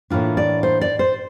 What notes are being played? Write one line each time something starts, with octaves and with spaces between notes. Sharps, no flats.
A2 E3 A#3 D4 F4
D5
C5
D5
C5